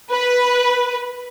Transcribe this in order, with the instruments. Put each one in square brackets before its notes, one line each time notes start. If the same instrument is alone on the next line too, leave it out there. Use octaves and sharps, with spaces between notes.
[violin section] B4